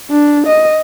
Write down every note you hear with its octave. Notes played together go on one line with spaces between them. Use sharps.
D4
D#5